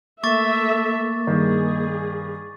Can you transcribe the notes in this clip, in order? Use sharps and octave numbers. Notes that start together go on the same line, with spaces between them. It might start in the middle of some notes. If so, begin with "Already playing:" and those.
A3 A#3 E5 C#6 D6 A6
G2 D#3 D#4 G#4